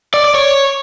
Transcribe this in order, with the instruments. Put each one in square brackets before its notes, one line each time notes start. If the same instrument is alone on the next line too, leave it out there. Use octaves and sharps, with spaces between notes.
[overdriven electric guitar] D5
D5
C#5